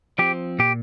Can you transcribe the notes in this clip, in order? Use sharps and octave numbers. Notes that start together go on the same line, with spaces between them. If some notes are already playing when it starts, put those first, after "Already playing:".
F3 C4 G4
A#2 G4